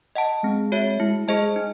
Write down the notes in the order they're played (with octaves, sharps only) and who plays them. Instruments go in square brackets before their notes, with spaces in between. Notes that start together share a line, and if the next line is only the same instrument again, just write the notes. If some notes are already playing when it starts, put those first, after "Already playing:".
[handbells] D#5 F#5 A5
[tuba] G#3 [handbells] C4
[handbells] F#4 C#5 E5
[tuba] G#3 [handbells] E4
[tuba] G#3 [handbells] G#4 C5 D#5 A5
[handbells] D#4